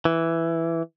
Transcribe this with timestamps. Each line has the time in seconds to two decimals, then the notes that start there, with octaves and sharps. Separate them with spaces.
0.05 E3